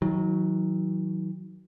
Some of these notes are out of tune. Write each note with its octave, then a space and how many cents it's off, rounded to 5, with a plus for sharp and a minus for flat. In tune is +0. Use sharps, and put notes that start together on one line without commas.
D#3 +40 F#3 +0